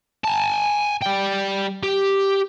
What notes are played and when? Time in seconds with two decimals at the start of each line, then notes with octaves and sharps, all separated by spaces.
0.24 G#5 A5
1.02 G3 G5
1.83 G4